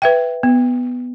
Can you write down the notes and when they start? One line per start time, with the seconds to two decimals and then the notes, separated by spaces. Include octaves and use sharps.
0.02 B4 E5 G5
0.43 B3